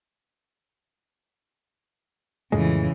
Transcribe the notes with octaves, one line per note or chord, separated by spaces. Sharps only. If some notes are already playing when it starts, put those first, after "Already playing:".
F2 A2 C#3 E3 G#3